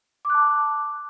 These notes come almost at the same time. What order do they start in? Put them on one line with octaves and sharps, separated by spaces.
D6 F#6 A5